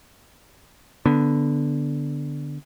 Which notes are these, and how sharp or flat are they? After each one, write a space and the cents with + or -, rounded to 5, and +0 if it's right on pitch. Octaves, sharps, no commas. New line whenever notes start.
D3 +0 B3 +0